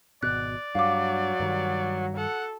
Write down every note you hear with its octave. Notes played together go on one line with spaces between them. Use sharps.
G#1 B2 D5 F#6
G2 F#3 F5 D6
G2 D#3 G3
A4 F#5